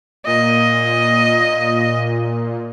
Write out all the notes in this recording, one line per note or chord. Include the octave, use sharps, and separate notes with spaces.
A#2 D#5